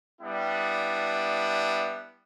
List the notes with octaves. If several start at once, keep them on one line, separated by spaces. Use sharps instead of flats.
G3 B3 D4 E4